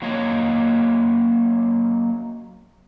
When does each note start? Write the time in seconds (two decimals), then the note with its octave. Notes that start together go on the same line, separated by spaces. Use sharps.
0.02 F#3 A#3 C#5 D#5